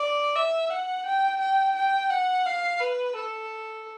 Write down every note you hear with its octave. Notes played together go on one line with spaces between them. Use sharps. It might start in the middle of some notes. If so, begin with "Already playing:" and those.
Already playing: D5
E5
F#5
G5
G5
G5
F#5
F5
B4
A4